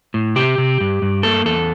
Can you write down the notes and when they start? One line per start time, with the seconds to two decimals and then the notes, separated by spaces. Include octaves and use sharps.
0.14 A2
0.36 C3 G4
0.58 C3
0.80 G2
1.02 G2
1.23 A#3 A4
1.45 E2 A4